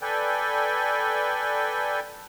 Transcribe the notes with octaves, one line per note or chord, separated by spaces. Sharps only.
A4 B4 D5 G5 G#5